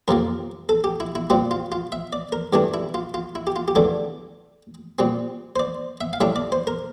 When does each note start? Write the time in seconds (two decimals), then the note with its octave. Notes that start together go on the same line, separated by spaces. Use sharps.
0.08 F2 C3 F3 A#3 A#4
0.69 A4
0.84 G4
1.00 E4
1.15 E4
1.30 A#2 G3 C4 F4
1.51 F4
1.72 F4
1.92 E5
2.13 D5
2.32 A#4
2.53 G2 E3 A3 D4 G4
2.74 E4
2.94 F4
3.14 F4
3.35 E4
3.47 G4
3.56 F4
3.68 G4
3.75 E2 D3 A3 D4 A4
4.99 A#2 G3 C4
5.56 C5
5.59 D5
6.01 E5
6.13 F5
6.21 A2 G3 D4 E5
6.36 D5
6.52 C5
6.67 A#4